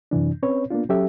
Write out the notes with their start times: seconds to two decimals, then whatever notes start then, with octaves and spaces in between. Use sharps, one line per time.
0.11 F#2 C3 E3 D4
0.43 C4 C#4 B4 C#5
0.70 A#3 B3 D4 F4
0.89 F#3 C#4 G4 A4 E5